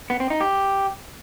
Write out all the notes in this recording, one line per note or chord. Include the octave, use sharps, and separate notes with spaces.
B3
C4
D#4
G4